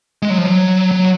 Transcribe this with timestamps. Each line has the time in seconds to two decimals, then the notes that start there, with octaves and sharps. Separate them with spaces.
0.22 G#3
0.30 F#3
0.38 F3
0.45 F#3
0.91 F#3